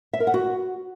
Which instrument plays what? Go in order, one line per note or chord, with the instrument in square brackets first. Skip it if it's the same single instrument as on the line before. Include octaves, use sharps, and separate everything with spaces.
[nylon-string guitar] E5
A#4
F#5
F#4